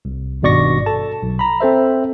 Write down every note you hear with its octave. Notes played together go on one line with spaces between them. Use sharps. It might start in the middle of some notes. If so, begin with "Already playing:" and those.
C2
G#1 G2 B2 D5 C#6 A#6
A4 A5
B1
A#5 B5
C4 A4 C5 E5